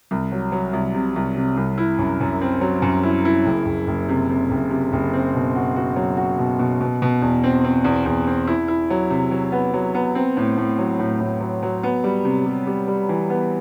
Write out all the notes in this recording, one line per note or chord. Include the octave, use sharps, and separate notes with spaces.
C2
F#3
F#3
C2
C3
C2
C3
C2
E4
F#2
F#2
C4
F#3
F#2
E4
E4
F#1
F#1
F#1
C3
C3
F#1
C3
F#1
C4
B2
F#4
F#4
F#3
F#4
B2
B2
B2
B2
E2
C4
C4
E2
E2
C4
E4
E4
F#3
C3
F#3
B3
F#3
B3
C4
A2
A2
F#3
A2
A2
F#3
F#3
B3
G3
C3
G3
G3
G3
E3
B3